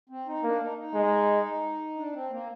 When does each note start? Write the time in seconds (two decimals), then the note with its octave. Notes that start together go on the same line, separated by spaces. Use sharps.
0.09 C4
0.27 D#4
0.43 A#3 D4
0.61 D#4
0.78 D#4
0.94 G#3
1.96 D4
2.14 C4
2.30 A#3